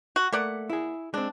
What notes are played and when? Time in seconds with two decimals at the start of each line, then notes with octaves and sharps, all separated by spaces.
0.16 F#4
0.33 A3 A#3 D5 F#5
0.70 E4 G#4
1.14 G#3 C4 D4